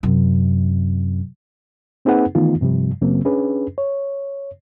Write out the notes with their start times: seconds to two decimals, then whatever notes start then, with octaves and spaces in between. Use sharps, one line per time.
0.03 F#2 C3
2.05 A#3 C4 D#4 G#4 B4 F#5
2.35 D#3 E3 A3 B3 D#4 F4
2.61 G2 C3 F3 G3
3.01 F#2 C#3 F#3 A#3 C4
3.25 C#4 D4 G#4 B4
3.78 C#5